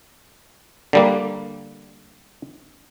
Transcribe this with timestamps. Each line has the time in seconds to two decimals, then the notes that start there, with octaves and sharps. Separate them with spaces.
0.93 D3 G3 A#3